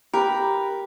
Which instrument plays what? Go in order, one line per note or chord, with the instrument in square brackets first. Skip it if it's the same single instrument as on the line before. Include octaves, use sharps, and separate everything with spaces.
[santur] G4 A#5 [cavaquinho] A#4 B4